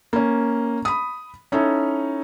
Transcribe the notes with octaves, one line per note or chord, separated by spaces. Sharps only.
A#3 C#4
B5 D#6
C#4 D#4 E4 A4 C#5